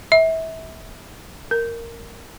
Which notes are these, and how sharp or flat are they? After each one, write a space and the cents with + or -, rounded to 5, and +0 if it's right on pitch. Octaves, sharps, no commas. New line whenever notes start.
E5 -25
A#4 -10